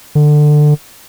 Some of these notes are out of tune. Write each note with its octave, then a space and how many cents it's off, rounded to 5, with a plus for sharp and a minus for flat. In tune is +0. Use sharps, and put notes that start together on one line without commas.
D3 +20